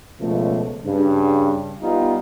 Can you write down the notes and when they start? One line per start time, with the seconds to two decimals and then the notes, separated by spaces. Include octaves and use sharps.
0.19 C#2 B2 F3 A3
0.85 G2 C#3
1.81 G3 B3 D#4 F4